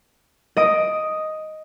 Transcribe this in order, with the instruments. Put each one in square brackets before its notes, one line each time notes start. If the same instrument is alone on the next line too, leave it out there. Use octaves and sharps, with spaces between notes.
[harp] D#5 D#6 D7